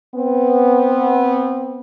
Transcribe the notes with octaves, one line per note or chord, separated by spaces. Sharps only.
B3 C4